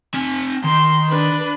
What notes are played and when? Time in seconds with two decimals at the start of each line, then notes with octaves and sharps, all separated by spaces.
0.14 C4 G#5
0.64 D#3 C6
1.09 D4 B4